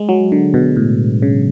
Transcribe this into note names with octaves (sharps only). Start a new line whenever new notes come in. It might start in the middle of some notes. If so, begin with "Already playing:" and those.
Already playing: G#3
F#3
D3
B2
A2
C#3